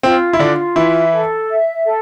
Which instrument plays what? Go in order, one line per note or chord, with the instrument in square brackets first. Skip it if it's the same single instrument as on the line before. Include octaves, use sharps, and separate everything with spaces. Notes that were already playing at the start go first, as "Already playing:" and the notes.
[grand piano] C4 [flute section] F4
[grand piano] E4
[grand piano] D3 D4 [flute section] F4
[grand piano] E3 E4 [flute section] E5
[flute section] A4
E5
A4